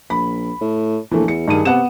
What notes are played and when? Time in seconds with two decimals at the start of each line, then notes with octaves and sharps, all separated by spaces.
0.10 A#1 B5
0.61 A2
1.11 A#1 E3 A3
1.28 E2 C#7
1.48 G2 D#3 G#4 D#7
1.65 C3 B3 F#5 E7